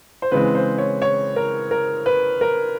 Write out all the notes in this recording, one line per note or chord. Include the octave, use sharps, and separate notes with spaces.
C5
C#3 E3 G#3 C4 B4
C5
C#5
C#5
A#4
A#4
B4
A#4